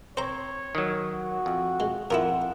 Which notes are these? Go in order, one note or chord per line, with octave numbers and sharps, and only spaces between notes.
C4 C5 C#5 A#5
D#3 F#3
F#4
F2
G#3
F2 E4 F4 A#4 F#5